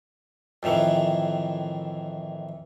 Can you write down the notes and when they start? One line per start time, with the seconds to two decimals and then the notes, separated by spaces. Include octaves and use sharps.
0.63 F2 A2 D#3 E3